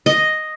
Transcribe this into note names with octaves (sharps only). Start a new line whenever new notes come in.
D#5